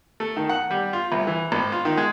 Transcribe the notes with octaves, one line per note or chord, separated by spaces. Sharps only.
A3
D#3
F#5
G3
F4
C2
E3
G#1
F4
D#3
G#3